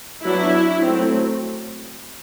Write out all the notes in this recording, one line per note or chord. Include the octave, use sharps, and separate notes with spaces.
F#3 B3 D4 E4
F#3 A3 C4